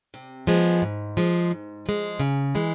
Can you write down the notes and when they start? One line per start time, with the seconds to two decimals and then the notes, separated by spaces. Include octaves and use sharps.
0.14 C3
0.47 F3 G#3 B3
0.82 G#2
1.17 F3 G#3
1.51 G#2
1.86 F3 G#3
2.20 C#3
2.55 E3 G#3